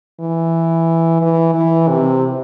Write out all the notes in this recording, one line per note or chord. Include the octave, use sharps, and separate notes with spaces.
E3
E3
E3
C3